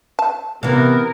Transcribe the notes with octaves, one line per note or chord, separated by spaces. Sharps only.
A5
C3 E3 B3 A#4